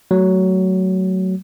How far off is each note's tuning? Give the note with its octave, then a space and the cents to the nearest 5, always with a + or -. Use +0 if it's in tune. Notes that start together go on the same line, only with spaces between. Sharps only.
F#3 +15 A3 +0